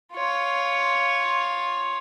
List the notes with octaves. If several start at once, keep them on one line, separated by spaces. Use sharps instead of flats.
F4 C#5